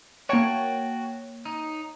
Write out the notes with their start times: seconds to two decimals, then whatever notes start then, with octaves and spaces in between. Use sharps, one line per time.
0.29 A#3 F#4 C#5 G5 A5
1.45 D#4